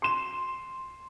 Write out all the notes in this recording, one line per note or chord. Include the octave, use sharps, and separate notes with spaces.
C6 E7